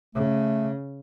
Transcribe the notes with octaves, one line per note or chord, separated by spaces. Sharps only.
C#3 A3